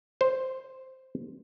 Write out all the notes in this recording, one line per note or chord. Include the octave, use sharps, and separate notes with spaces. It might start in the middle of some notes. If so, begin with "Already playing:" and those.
C5